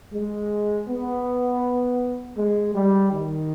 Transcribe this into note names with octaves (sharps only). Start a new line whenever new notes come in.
G#3
B3
G#3
G3
D#3